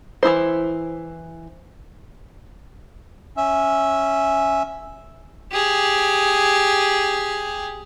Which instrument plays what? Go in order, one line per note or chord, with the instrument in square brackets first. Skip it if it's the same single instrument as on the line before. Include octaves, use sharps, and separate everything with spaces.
[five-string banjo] E3 C4 E4 C5
[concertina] C#4 E5
[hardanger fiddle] G4 G#4